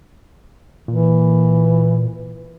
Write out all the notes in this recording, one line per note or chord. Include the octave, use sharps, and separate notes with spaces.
A#2 E3